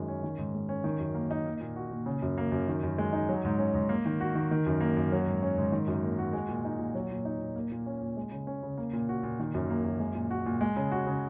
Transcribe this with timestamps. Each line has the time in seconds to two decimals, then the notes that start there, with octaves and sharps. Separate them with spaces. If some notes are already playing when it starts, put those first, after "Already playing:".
Already playing: F#2 D#3 G#3
0.08 C#4
0.23 D#3
0.38 G#2
0.54 G#3
0.69 C#4
0.84 D#3
1.00 F#2
1.15 A#3
1.31 D#4
1.46 A#3
1.60 A#2
1.76 F#4
1.91 A#2
2.06 C#3
2.22 F#2
2.38 A#3
2.52 F#2
2.68 D#3
2.83 F#2
2.98 G#3
3.13 D#4
3.29 F#3
3.44 G#2
3.59 C#4
3.75 G#2
3.89 A#3
4.05 D#3
4.21 F#4
4.35 D#3
4.51 D#3
4.67 F#2
4.81 A#3
4.97 F#2
5.12 F#3
5.27 G#2
5.43 C#4
5.58 G#2
5.72 D#3
5.88 F#2
6.03 A#3
6.18 F#4
6.33 G#3
6.48 A#2
6.65 D#4
6.79 A#2
6.95 F#3
7.11 A#2
7.25 D#4
7.41 A#2
7.56 A#3
7.72 A#2
7.86 C#4
8.02 A#2
8.17 G#3
8.32 C#3
8.47 C#4
8.63 C#3
8.78 A#3
8.93 A#2
9.09 F#4
9.23 A#2
9.39 D#3
9.54 F#2
9.70 A#3
9.85 F#2
9.99 G#3
10.15 A#2
10.31 F#4
10.46 A#2
10.61 G#3
10.76 C#3
10.92 F#4
11.07 C#3